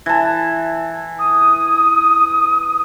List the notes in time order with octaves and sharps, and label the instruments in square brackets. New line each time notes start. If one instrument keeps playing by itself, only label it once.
[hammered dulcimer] E3 A5
[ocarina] D#6